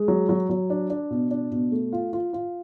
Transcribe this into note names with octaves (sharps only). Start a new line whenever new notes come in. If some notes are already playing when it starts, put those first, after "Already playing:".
Already playing: G#3
F#3
F#3
F#3
D4
D4
B2
D4
B2
A3
F4
F4
F4